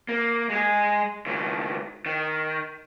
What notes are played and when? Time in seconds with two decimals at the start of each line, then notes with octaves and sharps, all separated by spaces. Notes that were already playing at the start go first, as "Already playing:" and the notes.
0.09 A#3
0.50 G#3 G#4
1.26 C#2 D#3
2.06 D#3